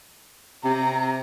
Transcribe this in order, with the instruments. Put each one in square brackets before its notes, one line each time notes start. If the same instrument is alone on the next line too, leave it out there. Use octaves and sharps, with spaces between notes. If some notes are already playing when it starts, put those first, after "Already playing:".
[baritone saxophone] C3 [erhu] A#5